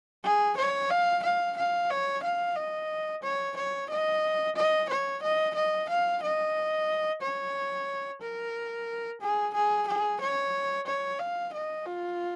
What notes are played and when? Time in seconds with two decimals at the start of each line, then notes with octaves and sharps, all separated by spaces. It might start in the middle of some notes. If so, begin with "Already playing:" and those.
0.24 G#4
0.57 C#5
0.91 F5
1.23 F5
1.57 F5
1.90 C#5
2.23 F5
2.56 D#5
3.23 C#5
3.57 C#5
3.90 D#5
4.56 D#5
4.89 C#5
5.23 D#5
5.55 D#5
5.89 F5
6.23 D#5
7.22 C#5
8.22 A#4
9.22 G#4
9.54 G#4
9.88 G#4
10.21 C#5
10.87 C#5
11.20 F5
11.53 D#5
11.86 F4